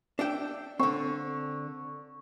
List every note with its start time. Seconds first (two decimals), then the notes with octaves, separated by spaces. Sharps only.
0.19 D4 E5 G5
0.79 D3 C4 C#6